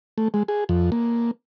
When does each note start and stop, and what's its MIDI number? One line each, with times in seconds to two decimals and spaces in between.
0.18 0.28 57
0.34 0.43 56
0.48 0.64 68
0.69 0.90 41
0.92 1.31 58